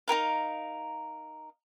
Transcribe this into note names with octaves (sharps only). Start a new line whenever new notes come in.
D#4 G4 A#4 F5